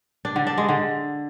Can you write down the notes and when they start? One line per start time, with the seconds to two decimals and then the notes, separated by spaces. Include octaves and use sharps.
0.25 D4
0.36 D3
0.47 D4
0.58 G#3
0.69 D3